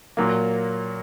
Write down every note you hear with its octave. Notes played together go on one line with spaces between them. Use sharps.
A#2 F#3 A#3